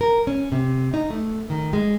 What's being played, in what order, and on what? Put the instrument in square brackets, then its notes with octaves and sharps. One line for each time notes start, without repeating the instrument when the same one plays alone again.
[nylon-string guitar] A#4
C#4
C3
D#4
A3
D#3
G#3